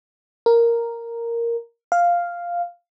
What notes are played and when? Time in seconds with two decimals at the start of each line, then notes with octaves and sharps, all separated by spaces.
0.46 A#4
1.92 F5